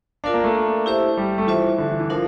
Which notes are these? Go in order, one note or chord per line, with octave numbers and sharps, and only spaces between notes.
D4 F4 A#4 D5 F5
A#3
A3
E4 G4 C5 E5
G3
A3
E3 F4 C5 E5
D3
E3
E3
F3 D4 F4 A#4 F5